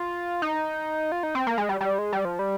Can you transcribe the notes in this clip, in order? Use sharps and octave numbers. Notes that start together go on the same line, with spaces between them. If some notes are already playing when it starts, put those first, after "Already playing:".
Already playing: F4
D#4
F4
D#4
C4
A#3
G#3
G3
G3
G#3
G3
F3
G3